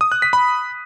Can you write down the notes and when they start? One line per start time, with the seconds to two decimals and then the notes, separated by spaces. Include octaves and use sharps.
0.01 D#6
0.12 F#6
0.22 B6
0.33 B5